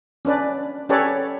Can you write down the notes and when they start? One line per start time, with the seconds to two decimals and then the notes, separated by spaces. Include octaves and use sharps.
0.25 C#4 D4 B4 D5
0.89 C#4 G4 A4 B4 C#5 D5